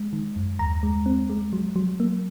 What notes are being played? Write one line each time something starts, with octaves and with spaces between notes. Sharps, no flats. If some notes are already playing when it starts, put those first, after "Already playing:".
Already playing: G#3
D#3
F#2
D#2 A#5
G#3
C4
G#3
F#3
F#3
A#3